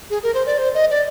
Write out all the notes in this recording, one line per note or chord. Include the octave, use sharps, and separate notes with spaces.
G#4
A#4
C5
D5
C5
D#5
D5